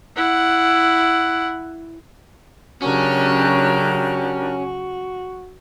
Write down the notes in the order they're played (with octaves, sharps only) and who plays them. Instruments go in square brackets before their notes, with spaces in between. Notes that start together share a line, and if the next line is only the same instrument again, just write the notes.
[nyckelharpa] E4 F#5
[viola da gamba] C#3 F#3 [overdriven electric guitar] C#4 [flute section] D4 G4 A#4 [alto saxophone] F#4